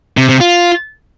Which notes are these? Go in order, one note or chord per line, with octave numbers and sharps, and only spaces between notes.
C3
C3
F4